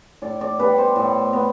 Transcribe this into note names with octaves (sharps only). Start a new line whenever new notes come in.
A2 D5
D5
G3 B3 B4
C5
A2
B3